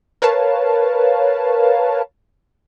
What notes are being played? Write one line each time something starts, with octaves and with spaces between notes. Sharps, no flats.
A#4 B4 C#5 F5 A5